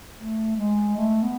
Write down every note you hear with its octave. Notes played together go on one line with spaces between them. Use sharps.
A3
G#3
A3
B3